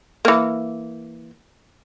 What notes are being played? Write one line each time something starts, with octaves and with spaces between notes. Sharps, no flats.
E3 A#3